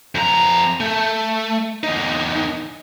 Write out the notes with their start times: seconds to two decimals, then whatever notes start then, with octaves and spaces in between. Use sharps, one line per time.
0.15 F2 A#5
0.80 A3
1.83 E2 D#4